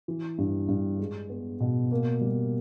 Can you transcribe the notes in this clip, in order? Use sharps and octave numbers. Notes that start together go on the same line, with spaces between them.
E3
G2
G2
G#3
B3
B2
A#3
G3